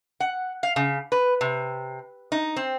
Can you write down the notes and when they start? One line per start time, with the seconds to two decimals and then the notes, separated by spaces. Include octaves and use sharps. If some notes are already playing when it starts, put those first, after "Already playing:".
0.20 F#5
0.63 F5
0.76 C#3
1.12 B4
1.41 C3
2.32 D#4
2.56 C4